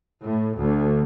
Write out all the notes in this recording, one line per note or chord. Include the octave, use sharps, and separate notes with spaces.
A2
D2